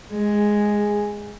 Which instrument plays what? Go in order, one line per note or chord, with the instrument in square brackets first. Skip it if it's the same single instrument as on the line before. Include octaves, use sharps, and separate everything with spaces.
[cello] G#3 [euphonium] G#4